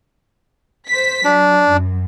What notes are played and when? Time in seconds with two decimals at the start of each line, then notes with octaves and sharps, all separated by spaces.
0.88 C5 B6
1.24 F#3 D4
1.70 F#2